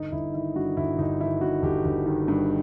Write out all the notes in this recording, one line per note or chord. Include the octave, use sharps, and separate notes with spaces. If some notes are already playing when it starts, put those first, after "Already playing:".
Already playing: G1 D#4
G1 E4
D#3 E4
G2 F#4
G1 E4
G1 D#4
D#3 E4
G2 F#4
G1 G4
G1
D#3
G2